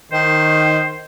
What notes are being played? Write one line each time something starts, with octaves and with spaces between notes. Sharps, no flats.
D#3 C5